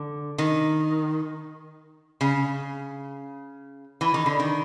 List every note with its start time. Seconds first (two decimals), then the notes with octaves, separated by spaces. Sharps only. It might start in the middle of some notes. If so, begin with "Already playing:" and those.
Already playing: D3
0.38 D#3
2.21 C#3
4.01 E3
4.14 D#3
4.26 D3
4.40 D#3